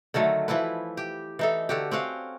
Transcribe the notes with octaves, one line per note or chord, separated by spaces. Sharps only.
D3 D#3 F#3 A3
E3 F3 E4 B4
G4
E3 D#4 A4
D3 F#4 G4
C4 C#4 F#4 F5